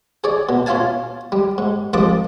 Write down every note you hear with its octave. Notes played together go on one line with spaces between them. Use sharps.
G#4 C#5 D5
B2
C#4 F4 E5 F5 G#5 A5
G3
G#2
C2 G#2 F3 A5 D6 D#6